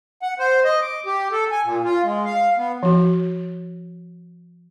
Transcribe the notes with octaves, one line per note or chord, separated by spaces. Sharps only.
F#5
C5
D#5
D6
G4
A4
G#5
A#2
F4
G#3
F5
B3
F3 F#4